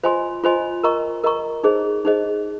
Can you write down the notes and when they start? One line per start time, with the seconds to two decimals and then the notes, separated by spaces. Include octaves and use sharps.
0.03 F4 C5 D#5 G#5 C6
0.44 F4 C5 D#5 G#5 C6
0.84 A#4 D#5 A#5 C#6
1.24 A#4 D#5 A#5 C#6
1.64 D#4 G#4 C5 D#5
2.05 D#4 G#4 C5 D#5